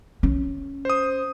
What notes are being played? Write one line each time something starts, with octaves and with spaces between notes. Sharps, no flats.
C#4
C5 D#6